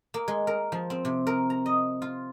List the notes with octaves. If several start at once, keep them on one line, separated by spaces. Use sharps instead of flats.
A#3
G#3
A#4
F3
C4
C3
A#4
A#5
D#5
F4